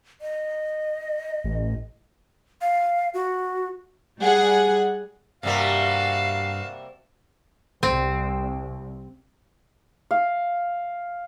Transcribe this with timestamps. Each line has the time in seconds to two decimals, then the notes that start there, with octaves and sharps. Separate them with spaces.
0.21 D#5
1.44 A1
2.61 F5
3.14 F#4
4.21 G3 G#4 F#5
5.43 G2 C3 G3 A#3 F#4 F5 A5
7.83 C2 C4
10.11 F5